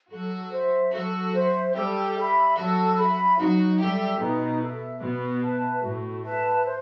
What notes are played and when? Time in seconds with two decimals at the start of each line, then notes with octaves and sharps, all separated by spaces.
0.11 F#3 F#4 A4
0.52 C5 E5
0.93 F#3 F#4 A4
1.34 C5 E5
1.74 G3 G4 A4
2.16 E5 B5
2.56 F#3 F#4 A4
2.98 E5 B5
3.38 F#3 D#4 F#4
3.79 G3 G4 A4 E5
4.19 B2 B3 D#4
4.61 A4 E5
5.01 B2 B3 F#4
5.43 B4 E5 A5
5.84 A2 A3 F#4
6.24 B4 E5 A5
6.65 C5